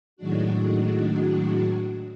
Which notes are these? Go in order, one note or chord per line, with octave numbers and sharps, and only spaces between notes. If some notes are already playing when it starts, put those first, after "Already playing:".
A2 D#3 F#3 G#3 D4 F#4